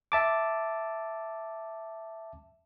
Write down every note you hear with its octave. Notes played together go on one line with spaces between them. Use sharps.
E5 A5 D6